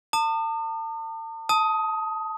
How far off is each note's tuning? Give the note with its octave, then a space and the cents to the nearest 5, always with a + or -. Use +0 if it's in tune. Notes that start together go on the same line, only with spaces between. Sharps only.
A5 +40 D#6 -40
A5 +0 D#6 +15